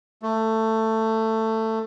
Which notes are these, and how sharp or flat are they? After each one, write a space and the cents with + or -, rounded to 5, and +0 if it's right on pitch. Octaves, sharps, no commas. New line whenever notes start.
A3 +15